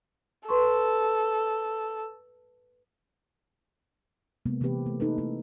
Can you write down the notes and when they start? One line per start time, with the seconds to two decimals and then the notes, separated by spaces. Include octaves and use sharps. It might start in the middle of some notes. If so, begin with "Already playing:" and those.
0.49 A4 B4 C6 C#6
4.46 C3 G#3 A#3 B3
4.61 C3 E3 A#3 C4 G4 B4
4.86 A3
5.00 A#3 D#4 A4 B4
5.18 A3 A#3 D#4 E4